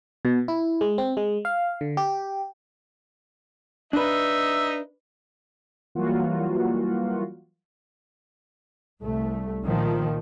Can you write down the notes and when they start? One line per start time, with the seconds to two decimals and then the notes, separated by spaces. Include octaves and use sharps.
0.25 B2
0.48 E4
0.81 G#3
0.98 C4
1.17 G#3
1.45 F5
1.81 D3
1.97 G4
3.93 D4 D#4 B4 E5
5.95 E3 F#3 G3 A#3 F4 F#4
9.02 C2 A3
9.64 A#2 D#3 F3